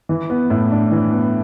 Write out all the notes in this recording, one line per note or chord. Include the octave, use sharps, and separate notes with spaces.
E3
B3
A2
D4
E3
B3